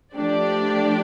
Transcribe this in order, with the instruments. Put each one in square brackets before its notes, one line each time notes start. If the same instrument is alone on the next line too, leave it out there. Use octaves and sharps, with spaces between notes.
[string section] F3 A3 D4 G4 D5